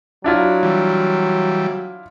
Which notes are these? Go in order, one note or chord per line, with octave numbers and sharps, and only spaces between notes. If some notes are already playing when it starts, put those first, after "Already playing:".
F#3 D4 E4 F4
E3 G3